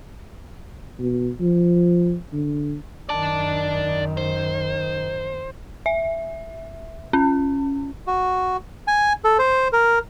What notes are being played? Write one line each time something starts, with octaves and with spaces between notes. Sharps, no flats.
B2
F3
D3
F#2 D#3 D5 A5
C5
E5
C#4
F#4
G#5
A4
C5
A#4